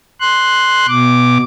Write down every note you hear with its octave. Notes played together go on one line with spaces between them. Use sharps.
C6 F#6
B2 D6